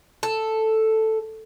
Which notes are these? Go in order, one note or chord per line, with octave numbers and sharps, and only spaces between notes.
A4